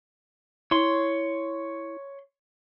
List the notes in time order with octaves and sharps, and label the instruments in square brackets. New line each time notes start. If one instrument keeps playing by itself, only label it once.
[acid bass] E4 [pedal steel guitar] C#5 C6